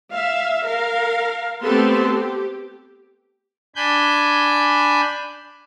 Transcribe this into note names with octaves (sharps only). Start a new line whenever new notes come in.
E5 F5
A#4 F5
A3 B3 C4 G4 A4 C6
G4
D4 G#5 B5 G6